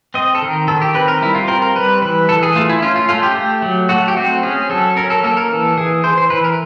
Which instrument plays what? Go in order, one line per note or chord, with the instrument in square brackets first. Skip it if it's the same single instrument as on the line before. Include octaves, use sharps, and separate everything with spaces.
[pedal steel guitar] C4 D#5
A4
D#3 A#4
D#3 A4
G4
C4 B4
A#4
G3 E4
F4
C4 A#4
A#4
G3 B4
E3 B4
E3 A4
G#4
A3 F4
E4
C#4 F4
F4
A3 F4
G4
A3
F#3
A3 F#4
G4
C4 F#4
C#4 G#4
F#3 A4
C#4 A#4
A4
A#3 A4
A#4
E3 A4
E3 G#4
E3 C5
C5
E3 B4
A#4